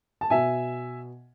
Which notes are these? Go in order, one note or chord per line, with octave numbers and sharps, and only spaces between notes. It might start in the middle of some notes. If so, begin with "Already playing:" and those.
A5
B2 E5 G#5